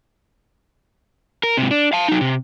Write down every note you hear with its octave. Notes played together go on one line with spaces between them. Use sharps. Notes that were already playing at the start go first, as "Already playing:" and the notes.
A#4
G#2 C3
D4
F5 A5
F#3 D#4
C3